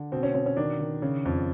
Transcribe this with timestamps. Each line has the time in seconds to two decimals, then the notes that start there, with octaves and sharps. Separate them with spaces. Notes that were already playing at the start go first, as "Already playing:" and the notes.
Already playing: D3
0.12 B2 C4
0.23 C#4
0.35 B2 C#4
0.46 C#4
0.57 D#3 D4
0.80 D#3
1.02 C#3
1.25 F2